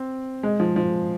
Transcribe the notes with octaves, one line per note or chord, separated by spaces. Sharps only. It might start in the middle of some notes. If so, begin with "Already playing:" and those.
Already playing: C4
G#3
F3
F3